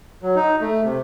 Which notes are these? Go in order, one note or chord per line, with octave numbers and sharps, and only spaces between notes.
F#3
D#4
A3
C3